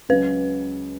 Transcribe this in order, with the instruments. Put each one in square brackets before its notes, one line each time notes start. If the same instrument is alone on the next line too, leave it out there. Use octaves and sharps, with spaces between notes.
[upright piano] C#2 C#3 F#3 C#4 [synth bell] B4